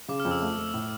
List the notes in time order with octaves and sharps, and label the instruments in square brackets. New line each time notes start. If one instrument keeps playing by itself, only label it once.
[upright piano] C#3 [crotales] D6
[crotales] F6
[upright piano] F2
[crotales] E6
[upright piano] A3
A3
A2